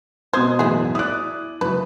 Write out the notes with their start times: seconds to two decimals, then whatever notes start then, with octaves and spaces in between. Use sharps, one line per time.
0.33 B2 C5 D#6 G#6
0.59 F#2 A2 E3 G#4 E5
0.95 E4 D5 D#6 F#6
1.61 C#2 F#2 E4 B4